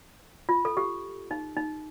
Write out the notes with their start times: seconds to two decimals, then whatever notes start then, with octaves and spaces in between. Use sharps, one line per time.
0.49 F4
0.65 A4
0.77 G4
1.31 D#4
1.57 D#4